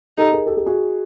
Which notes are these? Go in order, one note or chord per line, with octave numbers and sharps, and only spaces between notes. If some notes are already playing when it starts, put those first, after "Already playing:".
D#4 G4 A4
G#4 A#4
G4 A4
G4 A4
F#4 G#4